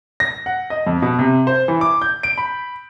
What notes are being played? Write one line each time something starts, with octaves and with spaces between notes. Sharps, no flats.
A#6
F#5
D#5
F2
B2
C3
C5
E3
D6
G6
D7
B5